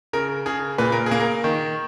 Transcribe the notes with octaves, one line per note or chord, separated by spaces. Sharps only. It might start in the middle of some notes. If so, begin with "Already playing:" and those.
C#3 A#4
C#3 G#4
A#2 B4
A#4
G#4
A#3
A#4
D#3